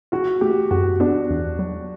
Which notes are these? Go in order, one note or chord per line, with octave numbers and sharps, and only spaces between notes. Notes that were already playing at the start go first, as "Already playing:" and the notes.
E4 F#4
A3 G4
F#2 F#4
B3 D4
E2
F#3